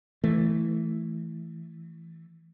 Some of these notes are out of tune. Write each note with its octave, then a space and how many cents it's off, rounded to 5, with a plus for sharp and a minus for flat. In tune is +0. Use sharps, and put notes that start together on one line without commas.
E3 +0 A3 +0